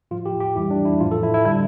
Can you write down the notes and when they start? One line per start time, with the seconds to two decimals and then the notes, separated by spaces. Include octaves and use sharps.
0.11 A2 F3 F4
0.26 G4
0.40 G4
0.56 F2 E3 G3 E4
0.71 D4
0.85 E4
1.00 A2 F3 F4
1.11 A4
1.23 E4
1.34 E4
1.45 D3 G3 E4